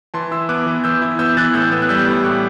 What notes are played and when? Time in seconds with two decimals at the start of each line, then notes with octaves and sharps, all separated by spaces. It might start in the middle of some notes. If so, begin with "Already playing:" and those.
0.14 E3 A5 C6
0.31 E4 C6 E6
0.49 B3 D6 F#6
0.66 E3
0.84 E3 E6 G6
1.02 E4
1.19 B3 E6 G6
1.37 E3 F#6 A6
1.54 A2 E6 G6
1.71 B3 E6
1.82 F#6
1.89 G3 E6 G6
2.08 A2
2.24 A2 D6 F#6